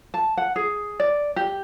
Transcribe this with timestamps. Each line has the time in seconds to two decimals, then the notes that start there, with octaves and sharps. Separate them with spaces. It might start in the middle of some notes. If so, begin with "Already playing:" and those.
0.14 A5
0.37 F#5
0.56 G#4
1.00 D5
1.36 G4